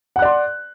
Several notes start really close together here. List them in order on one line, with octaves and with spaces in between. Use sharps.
F#5 F#6 D5 C6